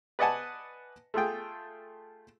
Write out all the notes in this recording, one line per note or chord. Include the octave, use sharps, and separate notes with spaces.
B4 D5 D#5 F#5 G#5 A5
A3 F4 G#4 G5